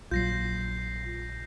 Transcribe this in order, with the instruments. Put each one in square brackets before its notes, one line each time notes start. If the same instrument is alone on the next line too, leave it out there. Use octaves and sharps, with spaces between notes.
[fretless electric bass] A#1 F#3 [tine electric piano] F4 [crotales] G6 A#6 C7